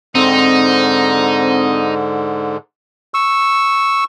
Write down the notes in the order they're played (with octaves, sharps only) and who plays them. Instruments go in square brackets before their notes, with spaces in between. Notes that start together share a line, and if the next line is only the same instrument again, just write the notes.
[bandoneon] G#2 D3 [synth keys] C4 [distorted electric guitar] D#4
[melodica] C#6 E6